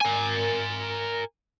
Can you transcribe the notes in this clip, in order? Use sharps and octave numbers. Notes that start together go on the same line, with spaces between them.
A#4 G#5